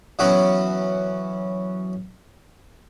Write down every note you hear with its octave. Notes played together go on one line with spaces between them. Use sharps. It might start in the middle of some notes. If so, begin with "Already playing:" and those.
E3 F#3 B3 C#4 F#4